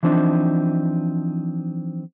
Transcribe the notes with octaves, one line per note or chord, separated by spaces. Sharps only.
E3 F3 C4 D4 D#4